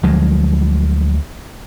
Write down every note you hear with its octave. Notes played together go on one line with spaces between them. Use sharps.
D2 F3 F#3 G#3